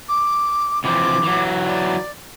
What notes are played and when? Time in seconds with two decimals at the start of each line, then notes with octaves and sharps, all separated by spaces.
0.09 D6
0.84 C3 E3 F3 D6
1.23 E3 F#3
1.66 D5